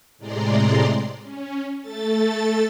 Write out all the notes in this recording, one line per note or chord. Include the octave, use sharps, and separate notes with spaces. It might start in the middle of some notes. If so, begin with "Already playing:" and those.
A2 C3 G#3 D5 A#5 C6
C#4
A3 A4 A6